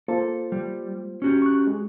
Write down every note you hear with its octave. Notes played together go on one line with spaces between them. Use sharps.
A#3 F4 A4 C5
G3
C#4 F#4 G4
C#6 F#6
G#3